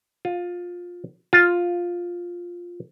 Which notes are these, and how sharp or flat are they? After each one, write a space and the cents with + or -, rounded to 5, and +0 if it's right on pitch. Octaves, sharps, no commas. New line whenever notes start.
F4 +15
F4 +5